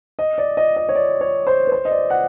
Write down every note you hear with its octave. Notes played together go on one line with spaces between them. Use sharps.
D#5
D5
D#5
D#5
C#5
D5
C#5
C5
B4
C5
D#5
D5
F#5